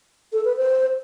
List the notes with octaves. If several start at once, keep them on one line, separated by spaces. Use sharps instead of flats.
A4
B4
C5